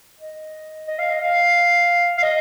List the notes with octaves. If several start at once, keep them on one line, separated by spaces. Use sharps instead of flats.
D#5
D#5
F5
D#5
F5
F5
D#5